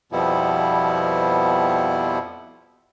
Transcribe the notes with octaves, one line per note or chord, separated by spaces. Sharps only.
F2 B2 F3 G3 B3 E4